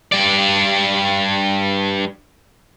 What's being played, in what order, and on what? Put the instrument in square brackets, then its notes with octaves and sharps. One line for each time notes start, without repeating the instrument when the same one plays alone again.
[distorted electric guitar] G2 D5